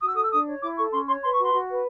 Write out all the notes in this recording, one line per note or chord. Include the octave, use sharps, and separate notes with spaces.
F#4 D#6
E6
A4 D#6
E6
D4 D#6
C#5
E4 D6
A4 C#6
C#4 C6
C#5 C6
B4 C6
F#4 C#6
C6
F#4
B4